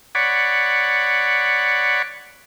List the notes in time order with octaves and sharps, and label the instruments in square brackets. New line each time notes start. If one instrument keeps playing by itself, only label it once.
[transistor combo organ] C#5 D5 F#5 B5